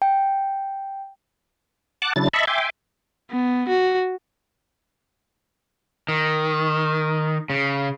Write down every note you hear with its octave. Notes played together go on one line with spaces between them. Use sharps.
G5
F#5 A5 D6 F#6
C#3 F#3 D4 E4 A6
D#5 E5 A5 B5 C#6
E5 G5 G#5 C6 D6
B3
F#4
D#3
C#3